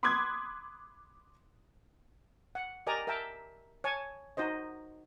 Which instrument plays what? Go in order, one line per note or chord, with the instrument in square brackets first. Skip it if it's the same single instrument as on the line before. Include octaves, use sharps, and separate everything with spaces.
[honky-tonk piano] B5 C6 D6 D#6 F#6 G#6
[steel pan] F#5
G4 A#4 D5 D#5 G#5 A#5
A#4 E5 G5 A5
C#5 G#5 A5
D#4 F#4 C5 D#5